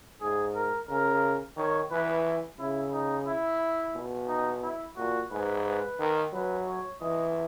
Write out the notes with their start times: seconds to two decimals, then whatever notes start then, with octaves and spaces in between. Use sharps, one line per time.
0.21 G#2 G#4
0.54 A#4
0.88 C#3 A#4
1.56 D#3 C#5
1.91 E3 B4
2.59 C#3 E4
2.93 D#4
3.27 E4
3.95 B2
4.28 D#4
4.63 E4
4.97 A#2 F#4
5.31 G#2 B4
5.65 B4
5.99 D#3
6.33 F#3 B4
6.67 C#5
7.00 E3 D#5